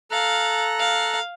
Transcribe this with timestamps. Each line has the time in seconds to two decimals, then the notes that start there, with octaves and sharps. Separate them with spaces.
0.11 A4 F5 A#5 F#6
0.79 F5